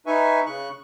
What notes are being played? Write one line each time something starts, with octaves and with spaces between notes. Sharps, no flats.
D#4 B4 E5 G#5 C#6
C#3 C#6 F#6